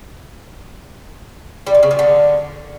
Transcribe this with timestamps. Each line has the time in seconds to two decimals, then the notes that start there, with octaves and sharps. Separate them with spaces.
1.67 G3
1.75 A#2
1.83 C#3
1.91 A#2
1.99 D3